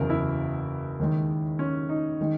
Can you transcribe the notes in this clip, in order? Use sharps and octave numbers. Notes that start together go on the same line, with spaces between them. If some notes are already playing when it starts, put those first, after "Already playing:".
Already playing: F#1 E2 C#3 F#3 A#4
E4
D#2 D#3 G#3
C#4
D#4
D#3 G#3